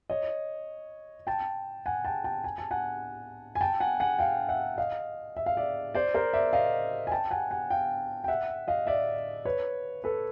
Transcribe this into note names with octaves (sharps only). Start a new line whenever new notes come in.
C#5 D#5
G5 A5
F#5 G#5
G5 A5
G5 A5
G#5
A5
F#5 G#5
G#5
G5 A5
F#5 G#5
F#5 G#5
F5 G5
E5 F#5
D#5 F5
E5
F5
D5 E5
C5 D5
A#4 C5
D5 E5
D#5 F5
G#5
G5 A5
F#5 G#5
F#5 G#5
F5 G5
G5
E5 F#5
D#5 F5
D5 E5
B4 C#5
A4 B4